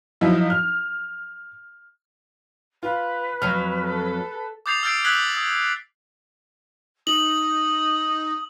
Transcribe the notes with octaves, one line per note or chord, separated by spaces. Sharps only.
F3 F#3 D#4 E4
F6
F4 B4
F2 F#3 F6
A4
D6 D#6 G6 A6 C7 F7
E6 F6 G6 A6 C7 D7
D#6 E6 F#6 G#6 B6 F#7
D#6
D#4 D#6 F#7